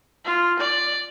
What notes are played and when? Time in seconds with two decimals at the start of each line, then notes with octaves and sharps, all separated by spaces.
0.25 F4
0.59 D5